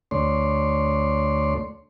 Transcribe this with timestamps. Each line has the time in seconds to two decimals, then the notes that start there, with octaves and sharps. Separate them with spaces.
0.11 D2 A3 C#5 D5 C6